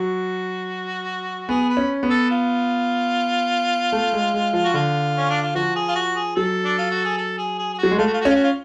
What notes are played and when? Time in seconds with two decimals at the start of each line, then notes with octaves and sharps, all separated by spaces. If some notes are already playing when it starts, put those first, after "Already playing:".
Already playing: F#3 F#4
1.49 B3 G#4
1.70 B4
1.77 C#4
2.03 B3
2.10 A4
2.31 F4
3.92 A3
4.13 G#3
4.34 G#3
4.53 F3
4.64 F#4
4.74 D3 F4
5.17 C#4
5.30 D4
5.42 F4
5.55 F3 F#4
5.76 G#4
5.88 F4
5.95 F#4
6.15 G#4
6.36 F#3 A4
6.65 D4
6.78 F4
6.91 F#4
7.05 G#4
7.18 A4
7.38 G#4
7.58 G#4
7.74 G#4
7.78 F#4
7.83 F#3
7.91 G#3
7.98 A3 F4
8.06 F#4
8.14 F4
8.21 F#4
8.25 C#4 F4
8.36 F#4
8.44 F4